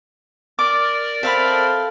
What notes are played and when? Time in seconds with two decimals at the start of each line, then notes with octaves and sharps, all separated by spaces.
0.59 A#4 D5 D6
1.23 C4 A4 E5 F5 B5